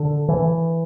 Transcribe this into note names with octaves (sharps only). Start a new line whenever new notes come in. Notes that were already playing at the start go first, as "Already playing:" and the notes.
Already playing: D3
E3